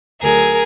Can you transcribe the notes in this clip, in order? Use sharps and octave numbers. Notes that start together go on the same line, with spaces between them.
D2 D3 F#3 G#4 A#4